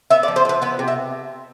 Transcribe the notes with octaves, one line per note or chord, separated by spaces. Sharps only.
B3 E5
D5
F3
C5
F3 B4
B3 B4
C3
E5